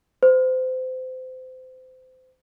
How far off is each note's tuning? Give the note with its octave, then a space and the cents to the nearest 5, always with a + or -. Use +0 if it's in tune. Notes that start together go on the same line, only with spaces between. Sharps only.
C5 -30